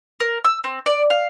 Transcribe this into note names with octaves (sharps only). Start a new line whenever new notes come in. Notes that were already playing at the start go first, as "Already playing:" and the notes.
A#4
E6
C4
D5
F5